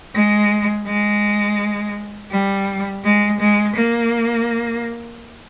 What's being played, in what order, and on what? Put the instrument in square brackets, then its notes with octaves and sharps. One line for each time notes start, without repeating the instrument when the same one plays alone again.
[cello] G#3
G#3
G3
G#3
G#3
A#3